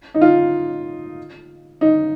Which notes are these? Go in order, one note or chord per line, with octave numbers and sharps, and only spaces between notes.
D#4
F4
D#4